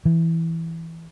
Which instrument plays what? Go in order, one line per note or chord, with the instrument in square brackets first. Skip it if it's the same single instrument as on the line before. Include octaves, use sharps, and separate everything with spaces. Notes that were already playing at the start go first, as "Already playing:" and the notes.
[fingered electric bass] E3